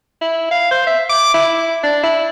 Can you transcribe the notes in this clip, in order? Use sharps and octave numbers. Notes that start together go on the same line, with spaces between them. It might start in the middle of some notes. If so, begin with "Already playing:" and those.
E4
F5
C5
E5
D6
E4
D4
E4